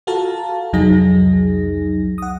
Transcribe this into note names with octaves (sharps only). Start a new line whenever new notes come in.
F4 F#4 A4 F5 A5 A#5
C2 F2 F#3 D#4 G#4 A#6
F#5 D#6